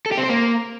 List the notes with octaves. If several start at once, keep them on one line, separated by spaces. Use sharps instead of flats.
A4
G4
C4
C5
A#3